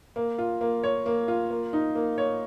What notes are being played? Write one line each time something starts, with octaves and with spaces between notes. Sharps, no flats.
A#3
F4
A#3
C#5
A#3
F4
A#3
D#4
A#3
C#5